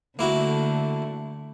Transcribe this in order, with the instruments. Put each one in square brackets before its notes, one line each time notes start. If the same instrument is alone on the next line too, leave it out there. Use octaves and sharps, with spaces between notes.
[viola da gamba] D3 A3 [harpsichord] A#3 E4 F#4